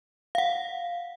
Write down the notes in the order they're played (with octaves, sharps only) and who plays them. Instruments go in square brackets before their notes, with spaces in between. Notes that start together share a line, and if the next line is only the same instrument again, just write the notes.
[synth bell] F5 F#5